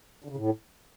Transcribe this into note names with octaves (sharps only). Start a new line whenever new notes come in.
D3
C#3
A2